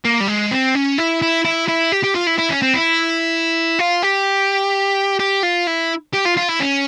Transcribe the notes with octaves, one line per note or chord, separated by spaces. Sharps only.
A#3
G3
G#3
C4
C#4
E4
E4
E4
E4
G4
G4
F4
E4
E4
C#4
C4
E4
F4
G4
G4
F4
E4
G4
F4
F4
E4
C#4